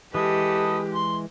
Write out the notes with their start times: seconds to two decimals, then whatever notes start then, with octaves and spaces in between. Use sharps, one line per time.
0.15 E3 G#3 G4 A4 B4 D#5
0.94 C6